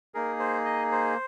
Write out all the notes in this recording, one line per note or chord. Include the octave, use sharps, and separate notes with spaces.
A#3 D#4 G#4 A#4
C5
D#5
C5